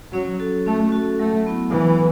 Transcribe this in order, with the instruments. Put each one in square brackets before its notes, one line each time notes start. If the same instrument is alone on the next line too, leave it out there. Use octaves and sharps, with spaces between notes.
[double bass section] F#3 [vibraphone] C#4
[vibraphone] F#4 A4
[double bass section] A3 [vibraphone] C#4
[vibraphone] F#4 A4
[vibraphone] F#3 [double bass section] A3
[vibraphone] B3 E4
[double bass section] E3 [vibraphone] F#3